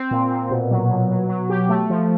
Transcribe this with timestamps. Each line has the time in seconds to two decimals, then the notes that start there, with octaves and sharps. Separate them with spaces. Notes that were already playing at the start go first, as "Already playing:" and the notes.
Already playing: C4
0.11 A#2
0.31 A#2
0.51 B2
0.71 F#3
0.91 B2
1.11 F#3
1.29 F#3
1.50 G4
1.69 A3
1.90 F3